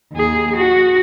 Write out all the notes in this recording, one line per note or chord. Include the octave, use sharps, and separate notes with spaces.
D#2 G#4
F#4